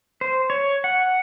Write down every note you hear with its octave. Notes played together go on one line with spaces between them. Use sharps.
C5
C#5
F#5